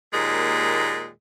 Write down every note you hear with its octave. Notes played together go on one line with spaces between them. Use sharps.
D#2 A#2 G#3